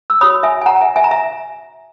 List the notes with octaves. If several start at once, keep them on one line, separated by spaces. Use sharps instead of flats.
E6
F#4 C#5 B5 D#6
E5 G#5
G#5
F#5 A#5
E5 G#5
E5 G#5
A#5
E5 G#5